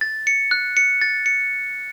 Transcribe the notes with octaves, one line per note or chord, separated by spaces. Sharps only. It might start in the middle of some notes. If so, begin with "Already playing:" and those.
A6
C#7
F#6
C#7
A6
C#7